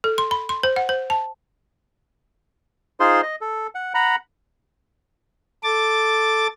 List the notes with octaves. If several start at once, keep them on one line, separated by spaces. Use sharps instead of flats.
A4
C6
B5
C6
C5
F#5
C5
A5
D#4 F4 G#4 C5 C6
D#5
A4
F#5
F#5 A#5 B5
A4 D6 A6